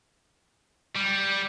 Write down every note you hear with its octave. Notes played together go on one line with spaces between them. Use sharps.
G3